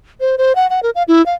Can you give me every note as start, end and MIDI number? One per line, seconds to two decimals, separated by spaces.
0.20 0.36 72
0.38 0.55 72
0.55 0.67 78
0.70 0.80 78
0.83 0.90 70
0.95 1.03 77
1.08 1.24 64
1.26 1.34 77